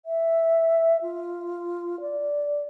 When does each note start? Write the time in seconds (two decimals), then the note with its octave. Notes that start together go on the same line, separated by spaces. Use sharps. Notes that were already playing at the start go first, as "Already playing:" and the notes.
0.06 E5
1.02 F4
2.01 D5